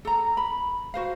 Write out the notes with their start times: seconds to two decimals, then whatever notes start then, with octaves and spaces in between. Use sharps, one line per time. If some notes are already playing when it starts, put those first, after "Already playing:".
0.05 A4 A#5
0.37 B5
0.94 F#4 C5 F5